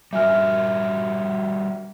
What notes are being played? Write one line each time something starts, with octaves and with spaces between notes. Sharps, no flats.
G3 F#4 A#4 E5 G#5 F6